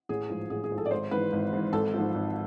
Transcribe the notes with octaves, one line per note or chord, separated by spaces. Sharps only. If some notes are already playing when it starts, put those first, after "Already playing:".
A1 G#4
G#2 F3
A1 G#4
G#4
G#2 F3
A4
D5
G#1 C5
G#2 E3 B4
G#1
G#2 E3
G#1 A4
G#2 F3
G#1